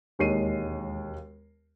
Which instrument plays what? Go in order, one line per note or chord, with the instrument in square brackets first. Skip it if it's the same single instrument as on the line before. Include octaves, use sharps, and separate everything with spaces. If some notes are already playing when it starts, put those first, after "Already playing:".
[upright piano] E1 D#2 G#3 C#5 C7 D#7